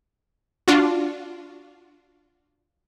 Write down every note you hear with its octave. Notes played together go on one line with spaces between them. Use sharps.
D4 F4 F#4